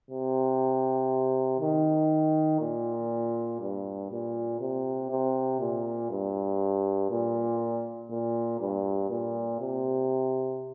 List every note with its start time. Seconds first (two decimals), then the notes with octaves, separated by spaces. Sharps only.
0.11 C3
1.60 D#3
2.61 A#2
3.61 G2
4.11 A#2
4.61 C3
5.10 C3
5.60 A#2
6.10 G2
7.11 A#2
8.11 A#2
8.61 G2
9.10 A#2
9.61 C3